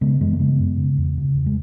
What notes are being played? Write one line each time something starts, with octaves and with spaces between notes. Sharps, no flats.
C#3 G#3 B3
F#2 E3 G#3
A#3
C#3 G#3 B3
F#2
C#3
E2
C#3
E2
G#3